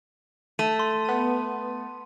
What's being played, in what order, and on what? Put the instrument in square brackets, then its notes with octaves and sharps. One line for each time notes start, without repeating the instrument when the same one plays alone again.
[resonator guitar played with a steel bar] A3 [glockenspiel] D#7
[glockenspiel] C6
[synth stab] B3 D#7